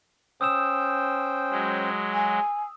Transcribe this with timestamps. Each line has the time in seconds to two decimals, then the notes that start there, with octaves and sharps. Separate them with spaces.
0.41 C#4 C5 G5 D#6 E6 E7
1.50 F#3 G#3
2.14 G#5